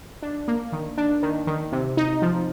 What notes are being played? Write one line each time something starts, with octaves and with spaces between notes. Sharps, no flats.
D4
A#3
D#3
D4
D#3
D#3
C3
D#4
F3